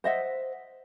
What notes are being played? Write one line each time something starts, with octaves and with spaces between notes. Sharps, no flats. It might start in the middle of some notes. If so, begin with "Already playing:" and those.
C5 D#5 E5 F#5